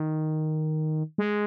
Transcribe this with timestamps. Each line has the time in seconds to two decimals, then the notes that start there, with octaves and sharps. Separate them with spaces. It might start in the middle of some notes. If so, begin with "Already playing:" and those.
Already playing: D#3
1.18 G#3